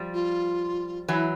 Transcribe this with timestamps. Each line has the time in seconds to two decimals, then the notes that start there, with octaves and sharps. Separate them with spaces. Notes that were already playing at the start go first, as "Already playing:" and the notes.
Already playing: F3 G3
0.13 F4
1.08 E3 F#3 E4